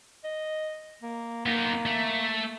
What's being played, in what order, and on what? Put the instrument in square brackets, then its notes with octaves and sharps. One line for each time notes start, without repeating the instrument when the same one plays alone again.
[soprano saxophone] D#5
A#3
[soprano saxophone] A#3 [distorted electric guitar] B3 D#4
[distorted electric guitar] A3